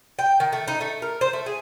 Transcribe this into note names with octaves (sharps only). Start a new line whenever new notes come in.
G5
D#3
A3
D#4
A3
A#4
C5
A3
G#4